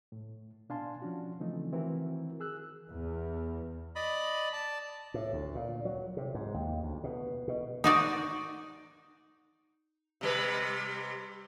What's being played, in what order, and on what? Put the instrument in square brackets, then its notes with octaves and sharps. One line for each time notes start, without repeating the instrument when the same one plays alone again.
[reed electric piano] A2
B2 D4 F5 G#5 A5 C6
F3 C#4 D4 F#4
C#3 E3 F3 A3 C4 D#4
D#3 E3 C4 E4 F#4 A#4
G#4 E6 F#6
[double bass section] E2
[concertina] D5 D#5 B5
D5 A5
[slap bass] A2
D2
A#2
F#3
C3
G#2
D#2
D2
B2
B2
[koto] D#4 F#4 D5
[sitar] C3 G3 B4